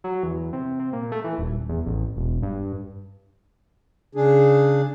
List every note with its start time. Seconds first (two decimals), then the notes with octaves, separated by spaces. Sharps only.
0.04 F#3
0.23 E2
0.53 C3
0.80 C3
0.93 A#2
1.12 A3
1.24 E3
1.38 D#1
1.69 E2
1.86 A1
2.16 E1
2.42 G2
4.15 C#3 D4 G#4